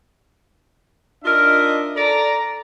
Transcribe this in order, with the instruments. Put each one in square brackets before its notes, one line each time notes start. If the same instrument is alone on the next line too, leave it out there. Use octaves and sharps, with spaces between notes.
[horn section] D4 D#4 F4 A#4 D#5 E5
A4 D5 A#5